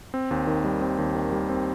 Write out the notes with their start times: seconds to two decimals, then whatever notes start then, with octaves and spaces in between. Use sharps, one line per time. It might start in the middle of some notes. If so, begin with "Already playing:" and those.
0.14 C4
0.31 D#2
0.47 D#3
0.65 G3
0.81 C4
0.98 D#2
1.15 D#3
1.32 G3
1.49 C4